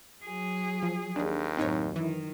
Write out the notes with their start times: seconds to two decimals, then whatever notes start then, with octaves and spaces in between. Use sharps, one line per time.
0.24 F#3 G#4
0.83 F3
1.16 D#2 D4 G#4
1.57 F#2 A2 C4 D#4 C#5
1.96 D#3 E3